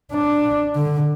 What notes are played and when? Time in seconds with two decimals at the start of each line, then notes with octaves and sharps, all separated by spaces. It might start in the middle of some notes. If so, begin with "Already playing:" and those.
0.12 D4
0.76 D3